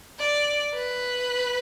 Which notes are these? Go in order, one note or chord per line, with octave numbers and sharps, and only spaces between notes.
D5
B4